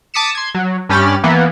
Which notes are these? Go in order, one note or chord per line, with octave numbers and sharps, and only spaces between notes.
A5 D6 D#6 B6 C#7 E7
C6 G#6
F#3
G2 C#4 G4 B5 F6 A6
E3 A#3 B3